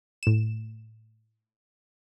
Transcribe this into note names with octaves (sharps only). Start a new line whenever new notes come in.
A2 E7